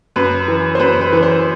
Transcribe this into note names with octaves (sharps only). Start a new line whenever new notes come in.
F#2 B4
E3
C5
F#2 B4
B4
E3
C5